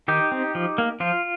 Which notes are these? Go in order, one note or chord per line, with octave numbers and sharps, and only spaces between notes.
D#3 D#4 G4
C4
F3
A#3
F3 F4